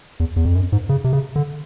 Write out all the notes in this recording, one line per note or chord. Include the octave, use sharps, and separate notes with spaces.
E2
E2
F2
F#2
G#2
C#3
C3
C#3
D3